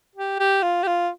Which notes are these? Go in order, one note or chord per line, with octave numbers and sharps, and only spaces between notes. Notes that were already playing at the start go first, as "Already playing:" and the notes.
G4
G4
F4
G4
F4